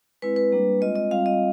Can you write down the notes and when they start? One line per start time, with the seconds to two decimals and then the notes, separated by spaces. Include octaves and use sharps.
0.22 G#3 C4 E4 B4
0.36 B4
0.52 G3 A#3 D4
0.81 G#3 C4 F4 D#5
0.96 D#5
1.11 G3 C4 F4 F5
1.26 D#5